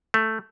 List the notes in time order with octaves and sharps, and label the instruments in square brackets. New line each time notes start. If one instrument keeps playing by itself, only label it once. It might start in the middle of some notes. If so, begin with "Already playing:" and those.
[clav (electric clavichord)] A3